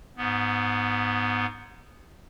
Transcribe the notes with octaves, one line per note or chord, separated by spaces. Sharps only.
G#2 B3